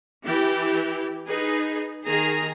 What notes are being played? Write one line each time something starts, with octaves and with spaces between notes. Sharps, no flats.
E3 G4
D#4 G#4 B4
D#3 G#4 A#5